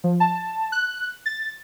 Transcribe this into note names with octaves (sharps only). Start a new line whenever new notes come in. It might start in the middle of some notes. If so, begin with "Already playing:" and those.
F3
A5
F#6
A6